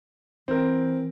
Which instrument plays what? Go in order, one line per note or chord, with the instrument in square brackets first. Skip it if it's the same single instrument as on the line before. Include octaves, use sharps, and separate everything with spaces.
[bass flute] E3 [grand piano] C4 A#4